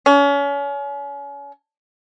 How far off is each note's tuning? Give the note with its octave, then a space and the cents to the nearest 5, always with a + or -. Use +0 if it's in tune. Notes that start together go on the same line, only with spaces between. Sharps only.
C#4 +35